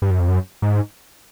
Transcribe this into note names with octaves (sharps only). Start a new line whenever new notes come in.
G2
F#2
F2
F#2
G#2